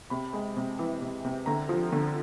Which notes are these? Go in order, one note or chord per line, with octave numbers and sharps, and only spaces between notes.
C3 B5
G#3
C3
E3
C3
C3
D3 A#5
F3
D3